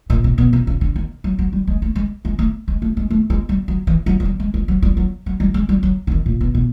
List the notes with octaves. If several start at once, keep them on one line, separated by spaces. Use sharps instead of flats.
A#2
C3
B2
C3
C#3
D3
D#3
F#3
F#3
G3
G#3
A3
G#3
G#3
A3
G#3
A3
G#3
A3
G#3
G3
F#3
E3
F#3
F#3
G3
G#3
G#3
F#3
G3
F#3
F#3
G3
G#3
G3
F#3
D3
D#3
A#2
B2
B2